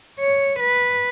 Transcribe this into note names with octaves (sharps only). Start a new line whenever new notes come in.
C#5
B4